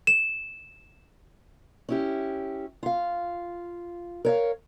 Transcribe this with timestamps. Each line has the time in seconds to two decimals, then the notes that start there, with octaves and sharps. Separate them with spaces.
0.07 E7
1.89 C#4 E4 G4
2.83 F4 F5
4.25 A#4 C#5 F5